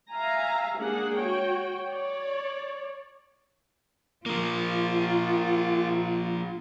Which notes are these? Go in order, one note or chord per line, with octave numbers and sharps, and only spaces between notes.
E5 F5 G#5 A#5
G#3 A#3 D4 G#4 F#5
F#4 C#5 G5
C#5 D5
F3 A#3 F4